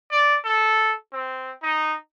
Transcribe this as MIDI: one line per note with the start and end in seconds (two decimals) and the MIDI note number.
0.12 0.36 74
0.45 0.93 69
1.13 1.51 60
1.63 1.95 63